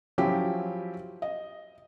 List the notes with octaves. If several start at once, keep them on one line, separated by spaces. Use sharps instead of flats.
F3 F#3 C#4 E4 G4
D#5